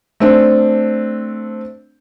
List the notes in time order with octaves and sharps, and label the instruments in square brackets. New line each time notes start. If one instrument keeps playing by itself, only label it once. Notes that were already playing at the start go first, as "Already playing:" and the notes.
[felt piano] A3 C4 D4